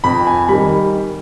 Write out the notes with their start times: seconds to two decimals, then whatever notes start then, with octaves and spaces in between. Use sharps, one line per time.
0.04 F2 B5
0.27 G#5
0.48 D#3 G3 B5